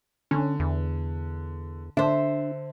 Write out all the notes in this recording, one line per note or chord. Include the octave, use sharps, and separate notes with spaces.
D3 C#4
E2
D3 D4 C5 E5